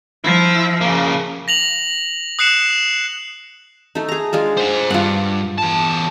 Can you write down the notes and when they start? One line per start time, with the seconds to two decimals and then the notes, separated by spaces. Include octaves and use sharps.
0.24 F3 E4
0.81 C#3 A#3
1.48 A#6 F7 F#7
2.39 D#6 F#6 C7 C#7 E7
3.95 A3 D#4
4.09 G#4 A#5
4.33 G#3 D4 F4
4.57 C5 F#5
4.90 G2 F4 F#5
5.58 E2 A5